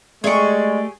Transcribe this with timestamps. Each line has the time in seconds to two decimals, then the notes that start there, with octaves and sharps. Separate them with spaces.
0.24 G#3 A3 G4 G#4 D5 C#6